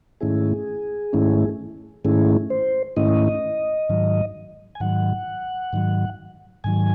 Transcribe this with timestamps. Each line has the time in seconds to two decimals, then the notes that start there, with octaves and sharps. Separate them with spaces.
0.21 G#2 D#3 A3 C#4 E4 G#4
1.13 G#2 D#3 A3 C#4 E4
2.04 G#2 D#3 A3 C#4 E4 G#4
2.50 C5
2.96 G#2 D#3 A3 C#4 E4 D#5
3.89 G#2 D#3 F#3
4.75 G#5
4.80 G#2 D#3 F#3 F#5
5.73 G#2 D#3 F#3
6.64 G#2 D#3 F#3 G#5